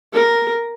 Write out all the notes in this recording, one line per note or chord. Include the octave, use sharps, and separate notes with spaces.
A#4